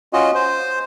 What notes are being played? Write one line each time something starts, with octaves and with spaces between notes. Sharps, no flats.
C#4 F4 F#4 D#5
C5